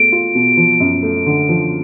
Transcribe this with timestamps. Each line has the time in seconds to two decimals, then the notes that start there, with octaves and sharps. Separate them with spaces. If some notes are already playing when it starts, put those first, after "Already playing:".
Already playing: B2 A3 G#4 D7
0.12 F4
0.35 B2
0.57 F3
0.80 F#2
1.03 A3
1.26 D3
1.49 F3